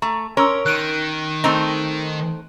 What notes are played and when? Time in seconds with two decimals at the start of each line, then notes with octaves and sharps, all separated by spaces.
0.02 A3 A#5
0.37 C#4 A#4 C#5 C6 E6
0.66 D#3 F#6 D7 D#7
1.44 A3 C4 D#4